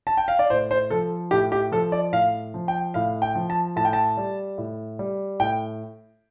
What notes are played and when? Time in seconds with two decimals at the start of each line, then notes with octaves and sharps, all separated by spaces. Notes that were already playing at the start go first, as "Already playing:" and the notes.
0.07 A5
0.17 G5
0.28 F5
0.39 D5
0.50 A2 C5
0.71 C5
0.90 F3 A4
1.31 A2 G4
1.52 G4
1.72 F3 A4
1.92 D5
2.13 A2 F5
2.54 F3
2.68 G5
2.94 A2 F5
3.22 G5
3.35 F3
3.50 A5
3.76 A2 A5
3.85 G5
3.93 A5
4.17 G3
4.58 A2
4.99 G3
5.40 A2 G5